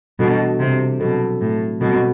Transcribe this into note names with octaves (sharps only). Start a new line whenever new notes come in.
B2 E3 G3 D4 F#4 A4
C3
B2 F#3 C4 F#4 A4
A2
B2 G3 C4 F#4 A4